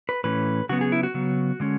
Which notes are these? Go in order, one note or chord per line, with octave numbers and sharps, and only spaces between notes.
B4
A2 E3 A3 C#4 B4
C#3 F#3 B3 F#4
G#4
E4
F#4
C#3 F#3 B3
D3 G#3 C#4